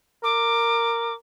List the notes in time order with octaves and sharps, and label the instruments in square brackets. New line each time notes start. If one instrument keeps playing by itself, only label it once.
[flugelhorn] A#4 [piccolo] D6